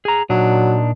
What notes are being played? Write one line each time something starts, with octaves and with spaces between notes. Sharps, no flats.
G#4 A#5
A#2 F#3 D4 D#4